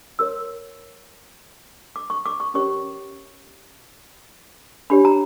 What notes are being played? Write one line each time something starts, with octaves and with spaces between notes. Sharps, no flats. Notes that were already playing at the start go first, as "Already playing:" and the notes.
F#4 A#4 C#5 E6
D6
C#6
D6
C#6
C#4 G4 A#4 C#5 C#6
D4 G4 C#5 B5
A#5